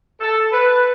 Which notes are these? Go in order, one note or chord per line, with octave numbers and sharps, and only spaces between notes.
A4
B4